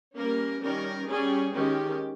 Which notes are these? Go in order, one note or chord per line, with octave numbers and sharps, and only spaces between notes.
G3 A#3 C#4 A#4
D#3 G3 C#4 A#4
G3 C#4 G#4
D#3 G#3 C#4 G4